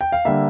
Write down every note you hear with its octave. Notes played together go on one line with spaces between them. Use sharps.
G5
F5
D3 G3 A#3 E5